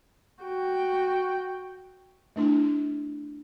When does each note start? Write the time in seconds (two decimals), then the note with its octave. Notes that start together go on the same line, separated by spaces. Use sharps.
0.44 F#4 G5
2.36 A3 D4 E4